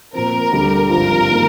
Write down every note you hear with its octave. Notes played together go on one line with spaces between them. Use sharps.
A#2 F3 C4 A#4
D2 D3 G3
G#1 G2 F3 C4 F4 A#4
D#3 A#3 F4 G#4